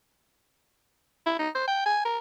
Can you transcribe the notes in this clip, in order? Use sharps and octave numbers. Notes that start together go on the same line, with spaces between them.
E4
D#4
C5
G5
G#5
A#4